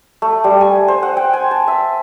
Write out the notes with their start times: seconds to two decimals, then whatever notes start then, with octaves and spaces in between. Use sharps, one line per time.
0.22 A3
0.44 G3
0.61 G#5
0.88 C5
1.03 F#5
1.17 G5
1.33 G#5
1.51 A5
1.68 E5